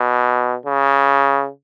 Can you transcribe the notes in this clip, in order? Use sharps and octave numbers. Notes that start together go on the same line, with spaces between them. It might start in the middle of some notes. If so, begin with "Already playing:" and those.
Already playing: B2
C#3